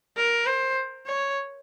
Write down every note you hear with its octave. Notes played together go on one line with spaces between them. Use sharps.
A#4
C5
C#5